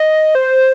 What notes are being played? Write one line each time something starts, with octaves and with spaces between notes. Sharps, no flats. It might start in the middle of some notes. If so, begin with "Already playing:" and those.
Already playing: D#5
C5